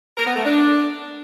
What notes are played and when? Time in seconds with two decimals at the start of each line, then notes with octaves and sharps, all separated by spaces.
0.17 A#4
0.26 B3
0.35 A3
0.45 D4